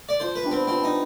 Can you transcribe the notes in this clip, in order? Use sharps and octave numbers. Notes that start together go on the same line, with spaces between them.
D5
F3 C5
B4
B3 D4 G4
C4
F3 C4
D#4